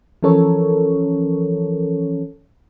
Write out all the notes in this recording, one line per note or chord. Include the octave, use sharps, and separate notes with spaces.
E3 F3 C#4 A4 A#4 C#5